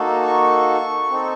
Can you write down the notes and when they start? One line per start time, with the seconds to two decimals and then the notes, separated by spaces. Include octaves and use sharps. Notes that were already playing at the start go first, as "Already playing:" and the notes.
Already playing: A#3 D#4 F#4 A4
0.25 C#6
1.11 C4 D#4 A4